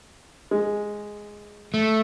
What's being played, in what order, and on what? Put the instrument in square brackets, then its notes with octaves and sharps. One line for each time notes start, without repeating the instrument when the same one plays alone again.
[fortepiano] G#3
[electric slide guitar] A3